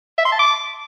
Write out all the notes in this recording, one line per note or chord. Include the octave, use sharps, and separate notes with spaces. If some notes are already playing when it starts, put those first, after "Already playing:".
E5
C6
A5
D6